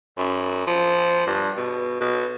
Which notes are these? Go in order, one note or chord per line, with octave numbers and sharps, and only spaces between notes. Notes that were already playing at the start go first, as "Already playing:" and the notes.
F#2
F3
G2
B2
B2